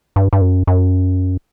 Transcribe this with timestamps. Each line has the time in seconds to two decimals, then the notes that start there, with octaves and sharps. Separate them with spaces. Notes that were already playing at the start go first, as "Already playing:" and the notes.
0.16 G2
0.33 G2
0.41 F#2
0.67 F#2